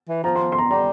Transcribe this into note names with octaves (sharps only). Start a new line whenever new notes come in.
E3
F3 A#5
C6
C6
A#5
G3 A#5